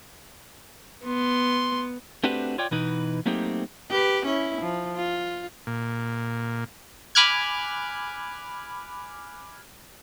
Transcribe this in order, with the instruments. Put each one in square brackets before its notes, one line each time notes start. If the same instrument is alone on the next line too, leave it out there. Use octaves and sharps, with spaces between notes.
[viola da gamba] B3 [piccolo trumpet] C6
[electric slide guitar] A3 C4 D4 F#4 G4 B4
F4 C#5 D5 G5
B2 E3 D#4 B4
F#3 A3 A#3 C4 D#4 G4
[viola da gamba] G4 B4
C#4 E4
F3
F4
[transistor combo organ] A#2
[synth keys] G#5 B5 D6 F6 F#6 G#6